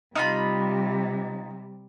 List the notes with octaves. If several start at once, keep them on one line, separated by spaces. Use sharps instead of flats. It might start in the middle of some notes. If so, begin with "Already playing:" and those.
C3 G3 D#4 F4 B5